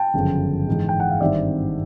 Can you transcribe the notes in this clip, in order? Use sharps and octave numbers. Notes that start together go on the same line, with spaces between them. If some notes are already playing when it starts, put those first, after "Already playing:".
Already playing: G5 A5
G1 F#2 C#3 F3
G#2 E3 G#3
G5
F#5
F5
G#1 G2 D#3 G3 C4 D5 E5